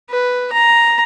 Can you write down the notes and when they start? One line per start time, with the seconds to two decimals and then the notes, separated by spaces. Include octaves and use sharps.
0.10 B4
0.53 A#5